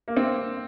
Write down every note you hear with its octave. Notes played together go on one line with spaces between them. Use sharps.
A#3
C4